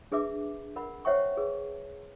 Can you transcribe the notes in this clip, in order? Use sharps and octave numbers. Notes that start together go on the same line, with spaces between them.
D4 G#4 B4 E5 D6
A#4 F#5 B5
C5 C#5 E5 F#5 G5 C#6
G#4 B4